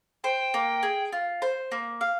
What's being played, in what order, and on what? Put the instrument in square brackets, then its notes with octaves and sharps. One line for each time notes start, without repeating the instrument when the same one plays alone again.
[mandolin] C5 [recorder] G5
[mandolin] A#3
G#4
F4
C5
A#3
F5